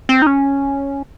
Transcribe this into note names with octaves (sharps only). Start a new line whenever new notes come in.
C4
D#4
C#4